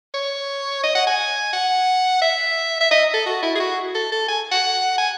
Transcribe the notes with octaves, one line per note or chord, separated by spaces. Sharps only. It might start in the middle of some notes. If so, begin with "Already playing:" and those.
C#5
D#5
F#5
G#5
F#5
E5
E5
D#5
A4
F#4
E4
G#4
F#4
A4
A4
G#5
F#5
G#5